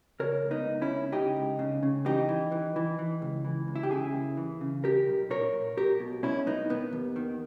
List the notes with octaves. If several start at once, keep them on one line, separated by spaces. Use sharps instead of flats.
C#3 A#4 C#5
C#2
B3 D#4
C#2
C#4 E4
C#2
C#3 D#4 G4
C#2
C#3
C#3
E3 D#4 G4
E3
E3
E3
E3
C#2
E3
C#2
E4
G4
C#3 E4 G#4
D#2
E3
C#3
B1 G4 A#4
B1
A#2 A#4 C#5
A#2
B1 G4 A#4
B2
B2 C#4 E4
B1 B3 D#4
D#3 B3
D#2
D#3